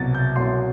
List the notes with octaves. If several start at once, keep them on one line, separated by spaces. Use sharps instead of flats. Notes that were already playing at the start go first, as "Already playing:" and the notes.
Already playing: C2 B2 F#3 A6
G6
C2 B2 F#3 C6